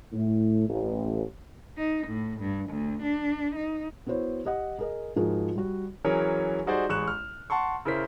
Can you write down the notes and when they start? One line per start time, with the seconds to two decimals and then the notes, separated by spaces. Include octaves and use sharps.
0.13 A2
0.68 A1
1.78 D#4
2.07 A2
2.40 G2
2.70 D2
3.02 D4
3.55 D#4
4.06 B3 E4 F#4 C5 C#5
4.45 G4 D#5 F#5
4.79 G#4 A#4 D#5
5.16 G#2 F3 F4 F#4 G#4 A#4
5.55 G3 F#4
6.05 E3 F#3 C#4 G#4 A#4 C#5
6.66 G3 D#4 F#4 G#4 C5 D5
6.89 A1 G#3 C#6 F#6 E7
7.08 F6
7.50 F#5 A5 C6 C#6
7.85 C#3 E4 A#4 C5 B6